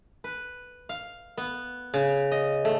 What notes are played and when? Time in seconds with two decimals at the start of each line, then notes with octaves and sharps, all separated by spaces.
0.24 B4
0.89 F5
1.37 B3
1.94 C#3
2.32 D#5
2.65 A3